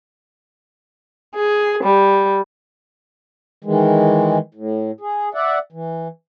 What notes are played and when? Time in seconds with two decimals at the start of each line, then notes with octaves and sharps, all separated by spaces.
1.35 G#4
1.82 G3
3.64 D#3 E3 G#3
4.55 A2
5.01 G#4
5.34 D5 E5 F#5
5.72 E3